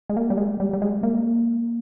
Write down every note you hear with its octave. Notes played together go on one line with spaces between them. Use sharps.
G#3
A#3
G3
G#3
G3
G3
G#3
A#3